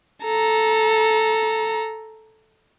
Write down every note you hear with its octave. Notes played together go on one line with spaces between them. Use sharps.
A4 A#5